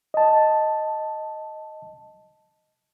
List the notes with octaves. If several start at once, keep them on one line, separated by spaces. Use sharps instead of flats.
D#5 A5